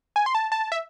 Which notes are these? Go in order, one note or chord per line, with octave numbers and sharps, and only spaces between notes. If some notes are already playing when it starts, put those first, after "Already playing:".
G#5
C6
A5
A5
E5